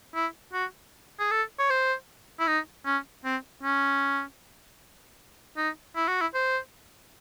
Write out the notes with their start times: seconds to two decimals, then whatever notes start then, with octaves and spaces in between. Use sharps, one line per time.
0.15 E4
0.53 F#4
1.20 G#4
1.31 A4
1.59 C#5
1.70 C5
2.40 E4
2.47 D#4
2.86 C#4
3.25 C4
3.63 C#4
5.57 D#4
5.96 E4
6.08 F#4
6.21 E4
6.34 C5